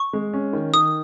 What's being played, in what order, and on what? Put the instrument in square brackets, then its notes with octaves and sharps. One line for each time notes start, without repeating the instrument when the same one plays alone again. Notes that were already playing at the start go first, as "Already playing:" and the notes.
Already playing: [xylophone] C#6
[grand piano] G#3
C#4
D#3
[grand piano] D#3 [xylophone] D#6